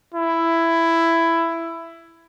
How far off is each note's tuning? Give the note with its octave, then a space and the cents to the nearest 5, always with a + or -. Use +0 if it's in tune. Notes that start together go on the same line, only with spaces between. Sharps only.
E4 +10